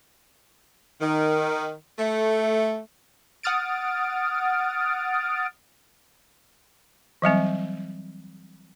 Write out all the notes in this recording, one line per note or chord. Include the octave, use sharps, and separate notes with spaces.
D#3
A3
F#5 D#6 F6 A6 D7
E3 F#3 G3 C4